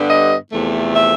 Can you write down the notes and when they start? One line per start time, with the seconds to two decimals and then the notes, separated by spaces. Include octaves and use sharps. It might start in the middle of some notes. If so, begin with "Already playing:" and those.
Already playing: G2 D3 G3 B3
0.09 D#5
0.52 E2 C3 F3 A3
0.95 E5